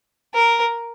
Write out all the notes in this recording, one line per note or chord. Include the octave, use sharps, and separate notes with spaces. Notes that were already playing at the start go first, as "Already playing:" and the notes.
A#4